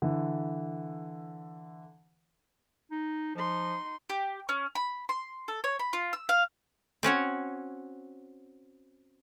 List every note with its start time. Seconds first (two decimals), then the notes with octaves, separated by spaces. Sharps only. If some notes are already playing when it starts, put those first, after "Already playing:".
0.02 D3 E3
2.91 D#4
3.36 F3 D#4 C6
4.10 G4
4.49 C#4
4.75 B5
5.09 C6
5.48 A4
5.64 C#5
5.79 B5
5.93 F4
6.13 E6
6.29 F5
7.03 C4 C#4 F#4 C#5